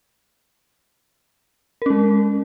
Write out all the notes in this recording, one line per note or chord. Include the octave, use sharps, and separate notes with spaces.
G#3 C#4 A#4